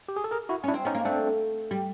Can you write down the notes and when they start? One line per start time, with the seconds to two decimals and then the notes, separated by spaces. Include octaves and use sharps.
0.09 G4
0.16 G#4
0.24 A4
0.31 G#4 A#4
0.49 E4 F#4
0.64 C#4 D4 E4
0.74 C4
0.85 B3 C#4 D#4
0.95 A#3
1.05 A3 C4 D4
1.71 G3